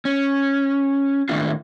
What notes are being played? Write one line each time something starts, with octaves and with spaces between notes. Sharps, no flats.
C#4
A2 D#3 A3 A#3 D4 F4